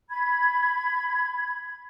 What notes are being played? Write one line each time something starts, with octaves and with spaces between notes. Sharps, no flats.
B5 G#6